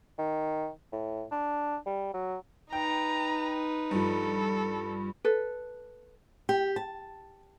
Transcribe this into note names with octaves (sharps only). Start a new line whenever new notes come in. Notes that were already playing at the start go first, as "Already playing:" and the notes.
D#3
A2
D4
G3
F#3
D#4 B4 G5 A#5
G2 F3 A4
A4 B4
G4
A5